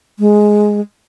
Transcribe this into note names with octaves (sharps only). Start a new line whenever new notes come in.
G#3